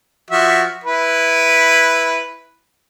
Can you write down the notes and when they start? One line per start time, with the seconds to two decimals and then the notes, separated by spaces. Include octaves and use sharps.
0.31 F3 F#4 E5
0.84 E4 B4